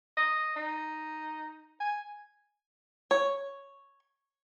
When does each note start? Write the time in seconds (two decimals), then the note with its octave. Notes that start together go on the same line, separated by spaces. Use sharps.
0.17 D#5
0.56 D#4
1.80 G#5
3.11 C#5